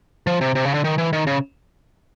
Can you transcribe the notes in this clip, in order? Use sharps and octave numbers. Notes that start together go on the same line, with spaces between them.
F3
C3
C3
C#3
D3
D#3
E3
D#3
C#3